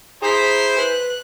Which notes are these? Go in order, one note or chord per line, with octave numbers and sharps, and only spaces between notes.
E4 G#4 C5 A#5 B6
B4 F#6